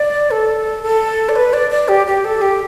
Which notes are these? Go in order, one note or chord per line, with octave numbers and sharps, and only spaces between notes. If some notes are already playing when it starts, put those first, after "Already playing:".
Already playing: D5
A4
A4
D5
B4
D5
D5
G4
G4
A4
G4